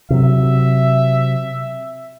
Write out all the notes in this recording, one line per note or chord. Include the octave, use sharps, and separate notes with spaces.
C3 F#3 E5